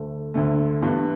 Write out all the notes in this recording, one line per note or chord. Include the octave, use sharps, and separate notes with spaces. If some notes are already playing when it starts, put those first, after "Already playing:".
Already playing: D2 D3 A3
D2 D3 A3
G2 E3 B3